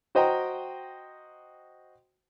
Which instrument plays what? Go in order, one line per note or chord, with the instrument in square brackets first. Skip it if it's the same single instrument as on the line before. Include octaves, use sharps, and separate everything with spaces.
[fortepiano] F#4 C5 D#5 G5 A#5